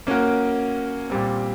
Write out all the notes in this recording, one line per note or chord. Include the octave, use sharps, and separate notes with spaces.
A#3 C#4 F#4 A#4
A#2 G3 C4